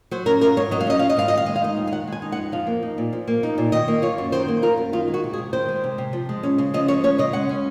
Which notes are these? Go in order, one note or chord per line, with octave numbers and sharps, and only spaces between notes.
F#3 C5
C#4 A#4
F4 A#4
G#2 C#5
F#3 D#5
F5
C#4 D#5
F4 F5
D#5
G#2 F5
D#5
D#3
F5
G#3 D#5
F5
D#4 D#5
F2
F5
D#3 F#5
G#3
G#5
D#4
F#5
F2
F3 F5
A#3
D#4
A#2
F3
A#3
D#4
A#2
D#3 D#5
A#3
F4 C#5
F#2
D#3 C5
A#3
F4 A#4
F#2
D#3 F4
G#3
F#4
C3
G#4
C3
D#3 C5
G#3
C3
C3
F3
G#3
C#4
C#3
F3 D#5
G#3 C#5
C#4 C#5
C#3 D#5
G#3 F#5
C#4